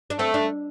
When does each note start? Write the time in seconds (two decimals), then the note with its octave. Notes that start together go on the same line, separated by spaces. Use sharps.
0.10 D4
0.19 A3 C4
0.34 D4